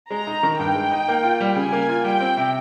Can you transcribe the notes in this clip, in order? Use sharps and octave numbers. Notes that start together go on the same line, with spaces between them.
G#3 A#5
D#4
D#3
G2 G5
G#3
D#4
A#3
F4
G3
C#3 G#5
A#3
F4
G3 G5
C4
C3